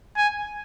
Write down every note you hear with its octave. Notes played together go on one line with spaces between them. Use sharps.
G#5